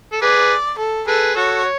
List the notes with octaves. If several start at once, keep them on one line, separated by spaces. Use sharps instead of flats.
A4
G#4 B4 D5
A4
G#4 A4 B4
F#4 A4 C#5
C#5